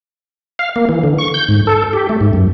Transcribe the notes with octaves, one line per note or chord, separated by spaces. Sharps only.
F5
A#3
E3
D3
C#6
G6
G#2
A4
G4
A3
G#2
F#2